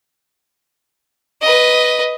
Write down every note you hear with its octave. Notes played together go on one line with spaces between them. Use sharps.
B4 D#5